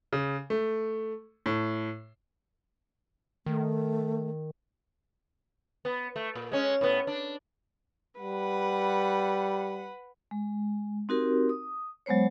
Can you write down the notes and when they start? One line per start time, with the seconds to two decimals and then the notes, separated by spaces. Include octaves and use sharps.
0.13 C#3
0.50 A3
1.46 A2
3.46 D#3 A3
5.85 B3
6.16 A3
6.35 A#2
6.52 G#3 C#4
6.81 A2 B3
7.07 D4
8.19 G3 B4 F#5
10.31 G#3
11.09 C4 D#4 F#4 G4 A#4
11.49 D#6
12.06 F#3 G#3 B3 C5 C#5